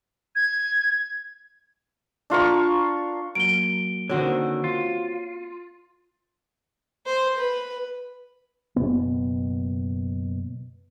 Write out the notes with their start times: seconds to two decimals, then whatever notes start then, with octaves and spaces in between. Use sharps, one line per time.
0.36 G#6
2.30 D4 F4 A#4 C#6
3.35 F#3 A#3 D7 G7
4.10 D3 D#3 A#3 C4 C#4 F#4 C5 C#5
4.64 F4
7.06 C5
7.38 B4
8.76 F#1 G2 B2 B3